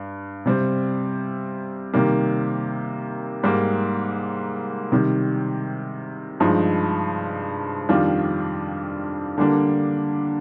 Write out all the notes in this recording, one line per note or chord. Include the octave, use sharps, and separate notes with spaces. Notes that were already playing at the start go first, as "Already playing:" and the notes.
Already playing: G2
C3 G3 C4
C3 D#3 G3 A#3
G#2 G3 A#3
C3 D#3 G3
G2 F3 G#3 D#4
F2 D#3 G3 D4 F4
D3 G3 A#3 D4